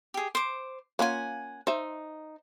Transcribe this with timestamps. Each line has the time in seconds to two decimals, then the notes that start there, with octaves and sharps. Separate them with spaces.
0.14 G4 G#4
0.35 C5 D6
0.99 A#3 C#4 F4 F#5 G#5
1.67 D#4 C5 E5